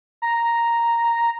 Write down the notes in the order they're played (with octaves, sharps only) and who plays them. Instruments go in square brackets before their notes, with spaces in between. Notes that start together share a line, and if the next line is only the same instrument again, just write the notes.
[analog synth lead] A#5